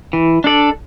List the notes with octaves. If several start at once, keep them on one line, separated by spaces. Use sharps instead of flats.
E3
D4 A4 D5